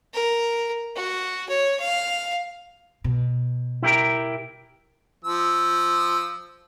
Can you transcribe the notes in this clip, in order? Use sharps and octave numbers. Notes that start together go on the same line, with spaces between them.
A#4
F#4
C#5
F5
B2
E4 G4 A#4
F3 E6